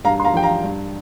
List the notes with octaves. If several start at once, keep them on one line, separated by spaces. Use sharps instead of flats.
G2 F5 A#5
C6
F5 A#5
F3 G5
F5 A#5
G2